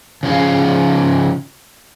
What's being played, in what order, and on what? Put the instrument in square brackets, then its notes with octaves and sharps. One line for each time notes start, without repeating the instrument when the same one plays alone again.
[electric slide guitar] C#3 F3 G#4 F5